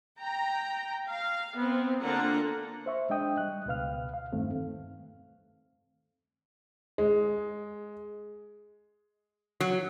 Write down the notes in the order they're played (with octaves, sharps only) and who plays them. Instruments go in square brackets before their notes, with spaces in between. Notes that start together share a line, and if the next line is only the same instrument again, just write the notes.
[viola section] G5 A#5
F5
B3 C4
D3 A#3 D4 F4 F#5 A#5
[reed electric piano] C5 E5 C#6
G#3 D4 D#5 G5 D#6
G3 F#6
C#2 B2 B4 F5 F6
F5
E2 G2 D#3 A3 C4
[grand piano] G#3
[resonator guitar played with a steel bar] F#3